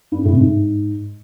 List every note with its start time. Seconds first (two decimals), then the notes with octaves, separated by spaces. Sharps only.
0.12 G2
0.19 F#2
0.25 A2
0.32 C3
0.39 G#2